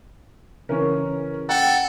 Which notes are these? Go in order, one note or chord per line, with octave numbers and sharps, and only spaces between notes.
C#3 E3 C#4 A#4
A4 F#5 G5